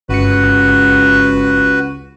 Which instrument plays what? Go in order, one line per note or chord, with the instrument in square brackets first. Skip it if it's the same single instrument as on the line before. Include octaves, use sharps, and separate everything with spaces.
[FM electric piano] G1 C#7 [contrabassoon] C#2 [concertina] F#4 B4